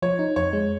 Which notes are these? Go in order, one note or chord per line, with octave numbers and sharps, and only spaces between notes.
F3 C#5
D#4
F2 C#5
G#3